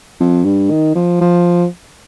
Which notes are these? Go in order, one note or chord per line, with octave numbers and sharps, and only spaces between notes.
F2
G2
D#3
F3
F3